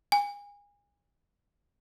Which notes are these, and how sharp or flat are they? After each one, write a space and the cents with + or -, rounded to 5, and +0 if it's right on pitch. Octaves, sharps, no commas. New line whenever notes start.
G#5 -30